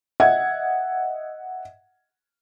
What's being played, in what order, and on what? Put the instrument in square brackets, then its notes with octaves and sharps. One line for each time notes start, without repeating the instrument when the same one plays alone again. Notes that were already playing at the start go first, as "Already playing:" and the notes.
[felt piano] D#5 E5 F#5 G#6